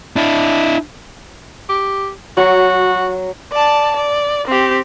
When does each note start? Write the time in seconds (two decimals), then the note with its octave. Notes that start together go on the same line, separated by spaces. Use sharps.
0.16 D4 E4
1.69 G4
2.37 F#3 F#4 C#6
3.52 D5 A5
3.96 D5
4.47 C4 G4